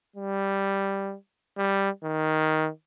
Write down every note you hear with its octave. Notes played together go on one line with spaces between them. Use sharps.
G3
G3
D#3